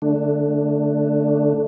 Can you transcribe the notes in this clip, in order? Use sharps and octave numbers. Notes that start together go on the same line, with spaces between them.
D3 A3 D4